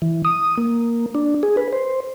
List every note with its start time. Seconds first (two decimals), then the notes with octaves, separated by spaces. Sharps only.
0.02 E3
0.25 D#6
0.57 A#3
1.15 D4
1.43 G#4
1.57 B4
1.73 C5